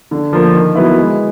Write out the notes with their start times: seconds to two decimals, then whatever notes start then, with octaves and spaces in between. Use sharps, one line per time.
0.11 D3
0.33 F3 A#3
0.54 D#3
0.75 F#3 B3 E4
0.97 G#3